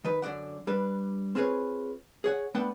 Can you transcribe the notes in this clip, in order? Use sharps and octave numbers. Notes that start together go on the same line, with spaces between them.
D#3 B4
F#2 D3 D5 F#5
G3 D4 B4
C4 F4 G#4 B4 C#5
G#4 C#5 F#5
A3 B3 D4 B4 F#5 G5